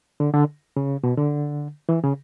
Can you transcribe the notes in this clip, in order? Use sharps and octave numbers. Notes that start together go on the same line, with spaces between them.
D3
D3
C#3
B2
D3
E3
C#3